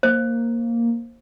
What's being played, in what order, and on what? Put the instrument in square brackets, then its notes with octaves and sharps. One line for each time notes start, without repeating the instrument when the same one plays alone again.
[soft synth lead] A#3 [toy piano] C5